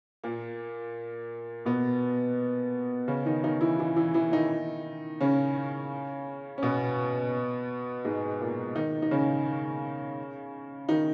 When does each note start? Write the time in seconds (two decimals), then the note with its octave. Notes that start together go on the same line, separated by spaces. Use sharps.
0.24 A#2 A#3
1.66 B2 B3
3.08 C#3 C#4
3.26 D#3 D#4
3.44 D#3 D#4
3.61 E3 E4
3.79 E3 E4
3.96 E3 E4
4.14 E3 E4
4.32 D#3 D#4
5.21 C#3 C#4
6.58 C#4
6.63 B2 B3
8.05 G#2 G#3
8.40 A#2 A#3
8.76 D#3 D#4
9.02 D#4
9.11 C#3 C#4
10.89 D#3 D#4